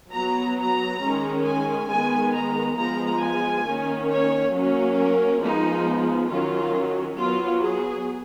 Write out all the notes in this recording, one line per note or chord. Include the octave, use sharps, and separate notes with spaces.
F#3 B3 A#5
A#5
D#3 G#3 C#4
G#5
D#3 G#3 B3 G#5
A#5
F3 G#3 B3 A#5
G#5
D#3 A#3 C#4
C#5
F#3 A#3 C#4
A#4
F3 G#3 B3 D#4
D#3 F#3 C#4 F4
F#3 B3 F4
G#4